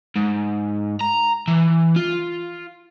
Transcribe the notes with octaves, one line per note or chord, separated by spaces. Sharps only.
G#2
A#5
E3
F4